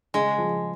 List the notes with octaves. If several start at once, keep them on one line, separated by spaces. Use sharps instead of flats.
C#3 G#3
F3